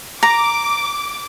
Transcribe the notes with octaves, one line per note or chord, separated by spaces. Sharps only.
A#5 D6